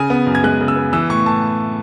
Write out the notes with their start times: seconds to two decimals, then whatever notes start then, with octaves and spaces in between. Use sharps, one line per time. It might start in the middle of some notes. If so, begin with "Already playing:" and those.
Already playing: C#3 G#5
0.10 B3
0.27 F#2
0.35 G#6
0.44 G#3 F#6
0.61 C#3
0.68 E6
0.76 B3
0.93 E3 E6
1.09 A2 C#6
1.26 A2 A5